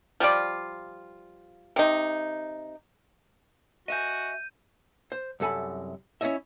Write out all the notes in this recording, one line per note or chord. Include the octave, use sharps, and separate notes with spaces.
F3 G3 F4 D5
C3 D#4
F#4 D#5 E5 G#5 G6 D#7
C5
C2 F#2 A4 G#5 B5
C#4 E4 C#5 D#5 E5